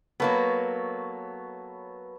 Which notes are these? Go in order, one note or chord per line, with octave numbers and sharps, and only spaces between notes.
F#3 A#3 B3 A4 B4 C#5